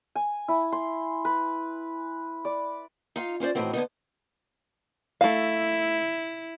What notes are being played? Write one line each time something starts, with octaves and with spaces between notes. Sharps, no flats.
G#5
E4
C6
B4
D5
D#4 F4 F5
C#4 F4 C5 D5
A2 D#3 E3 C4 F#4
D3 A#3 B3 D#4
A3 E4 F5